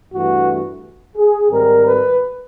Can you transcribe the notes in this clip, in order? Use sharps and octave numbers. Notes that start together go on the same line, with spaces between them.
G2 E3 A3 F#4
G#4
G#2 D#3 G3 C4 A#4
B4